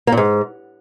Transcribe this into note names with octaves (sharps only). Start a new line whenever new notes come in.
A#3
A#2
G#2